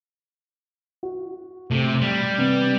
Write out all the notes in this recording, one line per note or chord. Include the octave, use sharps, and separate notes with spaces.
F#4
C3 A3
G3
C3 B3